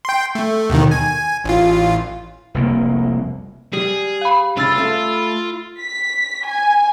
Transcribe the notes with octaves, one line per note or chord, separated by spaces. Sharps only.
G5 C6
A3
D#2 B2 D#3
G#5
A1 F4
F1 C2 A#3
G3 G#4
F5 B5
C2 C#3 F4 B5 E6 A6
A3 A4 E5
B6
G#5